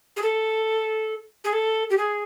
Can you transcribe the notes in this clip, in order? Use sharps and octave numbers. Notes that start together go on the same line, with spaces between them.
G#4
A4
G#4
A4
G4
G#4